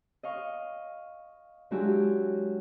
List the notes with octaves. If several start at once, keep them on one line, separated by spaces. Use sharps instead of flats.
D#5 F5 C#6
F#3 G#3 D4 E4 F#4 G4